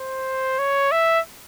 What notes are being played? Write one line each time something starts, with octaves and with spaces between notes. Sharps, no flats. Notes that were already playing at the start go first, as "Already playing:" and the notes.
Already playing: C5
C#5
E5